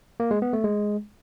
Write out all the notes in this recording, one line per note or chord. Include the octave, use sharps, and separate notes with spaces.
A#3
G#3
B3
A3
G#3